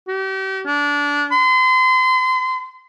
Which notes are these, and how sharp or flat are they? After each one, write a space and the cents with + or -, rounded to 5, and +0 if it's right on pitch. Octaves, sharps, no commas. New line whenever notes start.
G4 -35
D4 -20
C6 -35